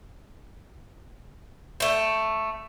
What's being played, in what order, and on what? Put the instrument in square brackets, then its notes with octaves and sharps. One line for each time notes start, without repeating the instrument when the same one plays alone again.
[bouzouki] A3 G5